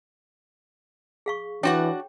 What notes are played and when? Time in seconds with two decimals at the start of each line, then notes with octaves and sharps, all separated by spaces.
1.26 G#4 F5 C#6
1.63 E3 D4 F#4 C#5 F#5 G5